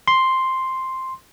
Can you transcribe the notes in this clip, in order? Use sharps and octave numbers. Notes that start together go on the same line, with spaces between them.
C6